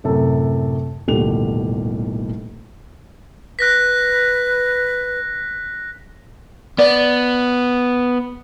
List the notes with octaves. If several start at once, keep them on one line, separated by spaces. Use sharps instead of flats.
F#2 A2 C3 A4
D#1 A1 B2 D3 G4 F7
B4 F#6 A#6 B6
B3 D5